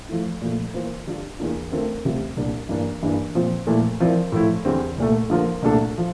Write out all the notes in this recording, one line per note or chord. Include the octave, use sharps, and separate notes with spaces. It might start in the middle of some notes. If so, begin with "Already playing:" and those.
F3 A3 E4
A#2 F3 A3
E3 A#3 F4 C5
D3 G3 D4 F4
E2 E3 A#3 D4 F4
D3 A3 C4 F4 A#4
D2 C3 G3 C4 F4
C2 A#2 G3 D4 G4
G2 E3 A#3 D4
G2 E3 A#3 D4
A#2 F3 C4 F4
A#2 F3 A3 E4 A4
F3 C4 E4 A#4 D5
A2 F3 A3 E4
E2 D3 G3 C4
C2 A#2 A3
D3 F3 A#3 F4 A#4
C2 A#2 A3 D4 A4
F3